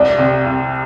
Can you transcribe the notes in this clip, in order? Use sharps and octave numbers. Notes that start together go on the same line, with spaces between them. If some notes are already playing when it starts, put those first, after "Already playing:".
Already playing: C2 D5
C3
C2